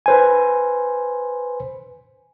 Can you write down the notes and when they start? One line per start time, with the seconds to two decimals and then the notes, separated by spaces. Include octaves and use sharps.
0.06 B4 C5 G#5